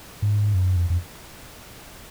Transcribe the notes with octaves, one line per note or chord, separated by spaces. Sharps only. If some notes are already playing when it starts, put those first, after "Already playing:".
G#2
F#2
F2
F2